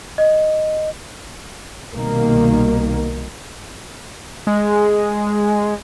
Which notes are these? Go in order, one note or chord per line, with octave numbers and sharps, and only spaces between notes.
D#5
C2 B2 D#3 A#3
G#3